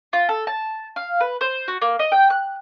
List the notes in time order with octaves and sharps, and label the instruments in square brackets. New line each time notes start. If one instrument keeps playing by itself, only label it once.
[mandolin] F4
A4
A5
F5
B4
C5
F#4
A#3
D#5
G5
F#6